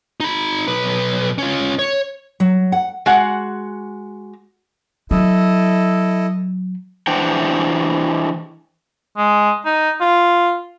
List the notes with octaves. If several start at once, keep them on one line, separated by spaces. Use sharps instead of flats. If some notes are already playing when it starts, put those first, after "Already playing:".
D#4 B5
B1 B4
C#4 F4
C#5
F#3
F#5
G#3 F#4 F#5
F#3 E4 A4 D#5
E3 D4 C5 F#5 G5
G#3
D#4
F4